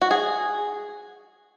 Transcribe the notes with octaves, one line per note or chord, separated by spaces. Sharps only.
F#4
G#4